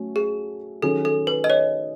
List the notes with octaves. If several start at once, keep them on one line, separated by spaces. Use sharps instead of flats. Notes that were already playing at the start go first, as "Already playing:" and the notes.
Already playing: F#3 A3 C#4
G#4
D#3 F#3 C#4 G#4 A4
A4
B4
D#5
C#5